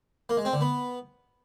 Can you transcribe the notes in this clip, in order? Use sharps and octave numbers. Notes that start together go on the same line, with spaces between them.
A#3
G#3
C4
D3
B3